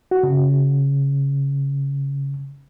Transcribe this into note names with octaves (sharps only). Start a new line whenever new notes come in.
F#4
C#3